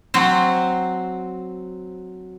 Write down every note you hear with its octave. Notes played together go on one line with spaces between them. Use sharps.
F#3 C4 C5